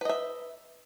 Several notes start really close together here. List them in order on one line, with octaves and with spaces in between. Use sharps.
B4 D#5 E5